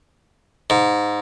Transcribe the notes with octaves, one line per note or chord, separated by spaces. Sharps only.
G#2